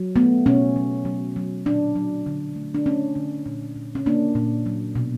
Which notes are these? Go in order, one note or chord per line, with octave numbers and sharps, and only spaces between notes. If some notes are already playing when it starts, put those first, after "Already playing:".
Already playing: F#3
A3 B3
B2 C#4
F#3
F#3
F#3
A#2 D4
F#3
D3
A3
D4
A3 C#4
D3
A#2
A#2
C#4
A#3 D4
A#2
F#3
B2